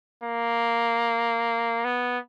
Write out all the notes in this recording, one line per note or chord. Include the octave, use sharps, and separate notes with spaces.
A#3
B3